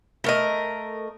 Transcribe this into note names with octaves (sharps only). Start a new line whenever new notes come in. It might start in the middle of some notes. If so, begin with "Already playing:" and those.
A3 A#4 D#5